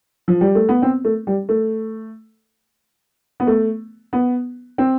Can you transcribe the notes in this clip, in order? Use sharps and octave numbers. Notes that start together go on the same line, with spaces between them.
F3
G3
A3
B3
C4
A3
G3
A3
B3
A3
B3
C4